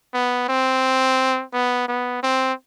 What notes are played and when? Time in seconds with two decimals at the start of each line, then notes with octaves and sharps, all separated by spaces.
0.14 B3
0.49 C4
1.53 B3
1.88 B3
2.23 C4